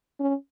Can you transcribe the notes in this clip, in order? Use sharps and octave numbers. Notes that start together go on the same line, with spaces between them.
C#4